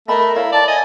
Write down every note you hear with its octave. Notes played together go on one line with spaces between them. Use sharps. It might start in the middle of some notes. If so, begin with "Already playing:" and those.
A3 A#4 D#5 E5 B5
E4 C#5 F5
D5 A5
D#5 G#5